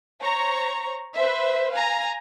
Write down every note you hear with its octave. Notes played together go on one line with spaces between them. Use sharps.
C5 C#5 A#5 C#6
B4 C5 E5
F5 G#5 A#5